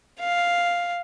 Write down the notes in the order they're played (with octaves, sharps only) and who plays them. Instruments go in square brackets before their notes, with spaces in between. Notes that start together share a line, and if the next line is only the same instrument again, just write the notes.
[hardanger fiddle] F5